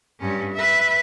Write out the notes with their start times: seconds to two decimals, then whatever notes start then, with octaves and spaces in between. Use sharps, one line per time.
0.20 G2 C#4
0.54 B4 E5